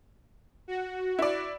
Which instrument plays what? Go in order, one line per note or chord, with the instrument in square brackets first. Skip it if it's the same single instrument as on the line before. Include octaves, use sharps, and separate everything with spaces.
[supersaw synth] F#4
[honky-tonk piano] E4 D5